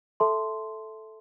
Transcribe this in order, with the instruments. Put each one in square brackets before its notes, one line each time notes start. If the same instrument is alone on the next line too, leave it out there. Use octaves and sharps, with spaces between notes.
[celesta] A4 E5 A5 C6